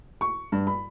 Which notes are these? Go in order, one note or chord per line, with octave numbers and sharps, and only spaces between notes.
C#6
G2
B5